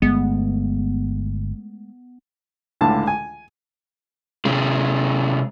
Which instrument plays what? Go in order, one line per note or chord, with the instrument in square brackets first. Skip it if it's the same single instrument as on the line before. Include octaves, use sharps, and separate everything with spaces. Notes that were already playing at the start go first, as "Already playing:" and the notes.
[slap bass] G1 [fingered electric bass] G#3 A3 [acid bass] B3
[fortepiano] C#2 A2 D3 F5 A5
G#5
[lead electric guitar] C3 G#3